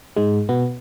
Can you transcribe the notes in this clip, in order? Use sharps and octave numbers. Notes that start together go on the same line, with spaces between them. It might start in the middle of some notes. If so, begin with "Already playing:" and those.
G#2 G#3
B2 B3